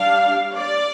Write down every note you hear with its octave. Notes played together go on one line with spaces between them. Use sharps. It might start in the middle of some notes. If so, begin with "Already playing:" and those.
Already playing: G3 D4 F5
D5